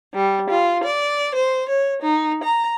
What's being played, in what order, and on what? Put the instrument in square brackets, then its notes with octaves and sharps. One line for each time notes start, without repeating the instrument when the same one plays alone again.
[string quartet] G3
F4
D5
C5
C#5
D#4
A#5